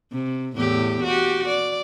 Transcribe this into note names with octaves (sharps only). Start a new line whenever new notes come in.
C3
E2 A2 G4
F#4 G4
D5